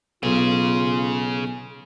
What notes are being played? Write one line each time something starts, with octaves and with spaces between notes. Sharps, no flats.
B1 C#3 F4 G#4